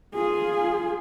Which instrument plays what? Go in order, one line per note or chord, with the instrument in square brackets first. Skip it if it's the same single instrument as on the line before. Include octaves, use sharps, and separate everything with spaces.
[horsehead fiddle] F4 G#4